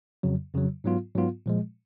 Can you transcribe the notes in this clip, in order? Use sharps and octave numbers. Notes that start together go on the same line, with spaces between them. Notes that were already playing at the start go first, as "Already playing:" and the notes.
F2 C#3 F#3
F2 C#3 F#3
G#2 F#3 B3 F4
G#2 F#3 B3 F4
A#2 F3 G#3